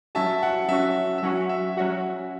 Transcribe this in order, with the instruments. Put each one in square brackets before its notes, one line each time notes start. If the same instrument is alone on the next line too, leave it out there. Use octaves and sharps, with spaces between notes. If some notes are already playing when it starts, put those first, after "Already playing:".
[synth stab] F#3 C#4 F#4 [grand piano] E5 A5
[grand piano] F#5
[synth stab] F#3 C#4 F#4 [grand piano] E5
[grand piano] E5
[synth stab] F#3 C#4 F#4 [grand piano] F#5
[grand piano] E5
[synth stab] F#3 C#4 F#4 [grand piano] F#5